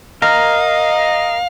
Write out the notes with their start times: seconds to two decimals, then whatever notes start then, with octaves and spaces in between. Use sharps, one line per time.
0.22 A#4 D#5 F5